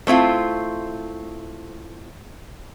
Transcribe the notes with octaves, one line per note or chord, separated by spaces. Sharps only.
A3 C4 E4 F4